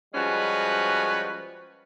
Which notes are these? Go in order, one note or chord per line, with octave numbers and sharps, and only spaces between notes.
F3 G3 G#3 C#4 F#4 B4